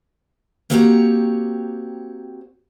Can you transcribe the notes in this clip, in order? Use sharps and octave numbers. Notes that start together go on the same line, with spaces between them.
A#3 C4 F#4 G4 C#5 A#5